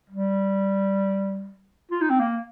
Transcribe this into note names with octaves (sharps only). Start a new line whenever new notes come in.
G3
F4
D#4
C4
A#3